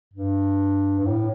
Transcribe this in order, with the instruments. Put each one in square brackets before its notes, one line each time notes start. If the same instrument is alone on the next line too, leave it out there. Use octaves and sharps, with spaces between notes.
[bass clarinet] G2
G2
A2